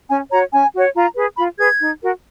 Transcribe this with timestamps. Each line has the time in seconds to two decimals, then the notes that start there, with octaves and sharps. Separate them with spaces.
0.09 C#4 G#5
0.30 F#4 C#5 A#5
0.51 C#4 G#5
0.74 F#4 C#5
0.94 F4 A#5
1.15 G#4 B4
1.36 F4 B5
1.58 G#4 B4 G#6
1.79 D#4
2.01 F#4 A#4